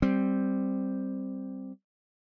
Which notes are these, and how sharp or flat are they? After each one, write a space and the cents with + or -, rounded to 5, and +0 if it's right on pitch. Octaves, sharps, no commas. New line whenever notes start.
G3 +0 C4 +0